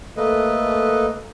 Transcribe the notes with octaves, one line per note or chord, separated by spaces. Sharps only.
A3 A#3 A4 B4 D#5